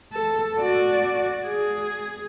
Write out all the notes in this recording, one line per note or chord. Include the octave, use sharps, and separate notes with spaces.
A4
F#4 D5
G#4